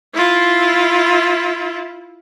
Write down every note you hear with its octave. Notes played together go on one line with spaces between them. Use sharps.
E4 F4